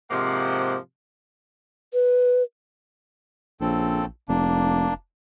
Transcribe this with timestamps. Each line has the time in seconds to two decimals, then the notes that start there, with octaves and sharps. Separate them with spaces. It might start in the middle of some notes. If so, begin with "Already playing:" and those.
0.11 G#2 C3 F3 A#3 F#5
1.94 B4
3.61 A#1 C#3 C4 A4
4.29 F1 A#3 D4